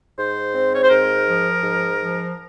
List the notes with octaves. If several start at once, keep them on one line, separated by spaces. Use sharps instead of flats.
G#2 C5
C4
C#5
C5
G#2 A#4
F3
G#2
F3